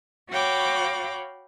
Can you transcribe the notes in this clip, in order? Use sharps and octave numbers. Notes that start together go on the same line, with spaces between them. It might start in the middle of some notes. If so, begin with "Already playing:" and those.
F#4 C#5 F5 G5 B5 D6